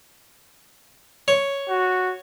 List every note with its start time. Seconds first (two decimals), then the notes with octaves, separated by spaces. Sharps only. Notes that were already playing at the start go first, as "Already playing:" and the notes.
1.28 C#5
1.68 F#4